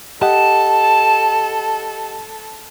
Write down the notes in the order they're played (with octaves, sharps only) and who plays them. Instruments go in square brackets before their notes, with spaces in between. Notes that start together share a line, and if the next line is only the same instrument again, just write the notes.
[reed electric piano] G4 D#5 F#5 [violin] A4 [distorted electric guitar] A5